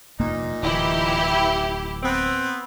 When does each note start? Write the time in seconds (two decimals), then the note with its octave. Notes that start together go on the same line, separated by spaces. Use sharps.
0.19 F1 G2 A#2 A#3 D#4
0.63 D1 E3 E4 G4
2.03 B3 C4